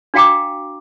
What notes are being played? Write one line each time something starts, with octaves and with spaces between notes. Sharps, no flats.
D4 F#4 F5 G5 A#5 D6